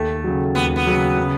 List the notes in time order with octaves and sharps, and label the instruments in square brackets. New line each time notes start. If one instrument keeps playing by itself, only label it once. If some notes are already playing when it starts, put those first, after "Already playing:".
Already playing: [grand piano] D#2 [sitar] A3
[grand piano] C#3 F#3
[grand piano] D#2 [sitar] B3
[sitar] B3
[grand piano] C#3 F#3
C#3